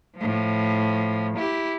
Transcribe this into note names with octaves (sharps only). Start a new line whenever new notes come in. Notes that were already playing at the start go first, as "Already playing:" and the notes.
A2 F3
E4 G4